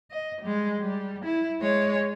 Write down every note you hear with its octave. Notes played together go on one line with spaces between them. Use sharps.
D#5
G3 G#3
G3
E4
G#3 C#5